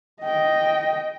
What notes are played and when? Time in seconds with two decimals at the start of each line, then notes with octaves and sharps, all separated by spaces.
0.23 D#5 G5